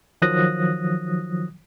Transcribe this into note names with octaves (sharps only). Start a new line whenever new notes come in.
D#3 F3 F#3 D#6 F#6 A#6